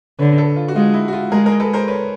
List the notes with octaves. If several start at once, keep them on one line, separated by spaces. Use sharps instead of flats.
D3 B4 C#5
A4 B4
F4
F#4
G#3 F4
E4
F#4
F4
G#3 G#4 A#4
G#4 A#4
A4 B4
A#4 C5
B4 C#5